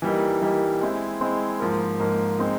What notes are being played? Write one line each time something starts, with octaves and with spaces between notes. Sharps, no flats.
E3 G3 A#3 D#4
E3 G3 A#3 D#4
G#3 C4 E4
G#3 C4 E4
G#2 F3 A#3
G#2 F3 A#3
G#3 C4 D#4